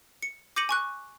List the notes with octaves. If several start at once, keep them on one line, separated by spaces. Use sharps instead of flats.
C#7
D6 G6 A#6 C#7 D#7 F#7
G#5 C#6 F#6